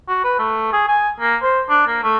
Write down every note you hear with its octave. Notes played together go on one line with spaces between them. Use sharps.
F#4
B4
A3
G#4
G#5
A#3
C5
D4
A#3
A3